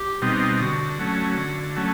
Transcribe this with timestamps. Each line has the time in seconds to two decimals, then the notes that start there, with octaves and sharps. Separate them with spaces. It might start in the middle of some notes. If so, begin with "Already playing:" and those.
Already playing: G4
0.22 B2 G3 C4 D#4
0.60 D3 F#4
0.99 F#3 A3 C#4
1.38 D3
1.76 F#3 A3 C#4